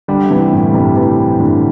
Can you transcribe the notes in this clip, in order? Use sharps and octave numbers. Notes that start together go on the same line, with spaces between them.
D3 G3
D3
C3 E3
A2
G2 C3
C3 E3
A2 D3